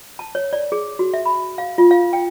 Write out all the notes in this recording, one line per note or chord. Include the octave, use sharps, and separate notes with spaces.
A5
C#5
D5
G#4
F#4
E5
B5
F5
F4
F5
G5